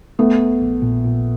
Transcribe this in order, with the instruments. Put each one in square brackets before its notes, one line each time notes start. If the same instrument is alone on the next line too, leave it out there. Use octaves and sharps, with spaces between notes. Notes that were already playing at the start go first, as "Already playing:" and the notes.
[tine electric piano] A#1 [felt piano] A3 B3
[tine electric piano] A#1
A#1
A#2
A#2